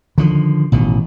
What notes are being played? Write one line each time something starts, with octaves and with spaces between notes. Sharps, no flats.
D3 D#3 F3
A1 B2 D#3